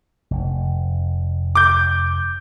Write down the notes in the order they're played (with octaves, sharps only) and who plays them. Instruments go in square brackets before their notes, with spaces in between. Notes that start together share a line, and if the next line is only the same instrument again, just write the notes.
[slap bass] F1
[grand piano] D6 G6